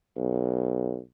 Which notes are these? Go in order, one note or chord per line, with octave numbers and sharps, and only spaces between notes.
B1